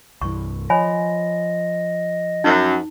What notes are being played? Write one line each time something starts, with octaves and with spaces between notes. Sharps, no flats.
C2 G2 E3 C#6
F3 C#5 D#5 G#5 B5
F#2 D#4